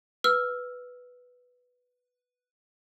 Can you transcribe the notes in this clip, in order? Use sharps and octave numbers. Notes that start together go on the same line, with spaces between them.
B4 E6 F6